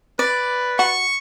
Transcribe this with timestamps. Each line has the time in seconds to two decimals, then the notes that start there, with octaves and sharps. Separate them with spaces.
0.19 B4 D5
0.79 F#4 C#6